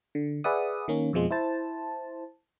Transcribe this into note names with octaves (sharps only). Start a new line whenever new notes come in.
D3
G#4 B4 D5 E5 F#5 D#6
D#3 A#3 C#4
F2 B2 F3 G#3 F4
E4 C5 A5